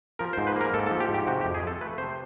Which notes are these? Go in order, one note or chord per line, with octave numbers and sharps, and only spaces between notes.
F3 A#4
C5
G#2
B4
A#3 A#4
G#2 A4
A4
F3
G4
G#2
G4
C3 F#4
G4
F2
G#4
F3 A4
A3 B4
C3 C5